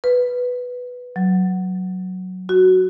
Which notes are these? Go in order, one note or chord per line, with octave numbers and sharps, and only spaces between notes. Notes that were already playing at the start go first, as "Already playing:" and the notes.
B4
F#3
F#4